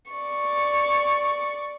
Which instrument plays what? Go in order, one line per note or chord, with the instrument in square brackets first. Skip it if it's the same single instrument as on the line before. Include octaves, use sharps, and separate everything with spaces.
[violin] D5 C#6